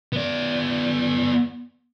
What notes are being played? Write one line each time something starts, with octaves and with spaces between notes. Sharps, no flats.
B3 D5